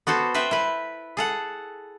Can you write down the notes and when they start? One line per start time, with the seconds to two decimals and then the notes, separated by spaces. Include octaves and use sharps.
0.07 B3 F#4 A4 C5
0.34 B4 C5 E5 G5
0.51 E4 B4
1.17 G#4 A4 F#5